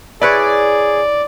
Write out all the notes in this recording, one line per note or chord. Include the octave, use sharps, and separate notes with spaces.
E4 G#4 B4 C#5 D5